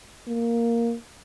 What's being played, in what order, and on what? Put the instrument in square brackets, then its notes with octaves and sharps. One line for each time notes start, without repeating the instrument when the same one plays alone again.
[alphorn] A#3